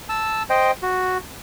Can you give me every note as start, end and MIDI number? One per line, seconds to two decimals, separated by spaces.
0.09 0.43 81
0.09 0.43 88
0.50 0.71 72
0.50 0.71 75
0.50 0.71 79
0.83 1.18 66